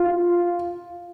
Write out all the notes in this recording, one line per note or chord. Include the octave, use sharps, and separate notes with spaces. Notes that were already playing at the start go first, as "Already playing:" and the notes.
Already playing: F4